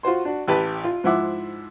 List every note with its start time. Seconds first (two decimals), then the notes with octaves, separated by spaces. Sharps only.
0.03 F4 F#4 C5 C6
0.25 D4 F#4
0.48 A1 G4 B4 A5
0.84 F4
1.04 G#2 F3 E4 E5 F#5 D6